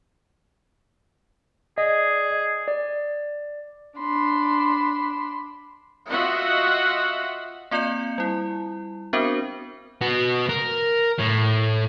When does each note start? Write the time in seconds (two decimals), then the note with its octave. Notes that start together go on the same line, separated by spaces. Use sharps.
1.78 G#4 D5 D#5
2.68 D5
3.98 D4 B5 C6
6.09 F4 F#4 D#5 E5 F#5
7.71 A#3 C4 F4 D5 G6 C#7
8.18 G3 E4
9.13 B3 C4 D4 F#4 A#4 C5
10.01 B3 F#4
10.49 A#4
11.18 A2